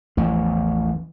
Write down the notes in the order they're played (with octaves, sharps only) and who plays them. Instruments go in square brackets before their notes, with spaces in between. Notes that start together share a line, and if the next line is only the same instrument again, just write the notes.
[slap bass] A1 E2 F3 [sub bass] E3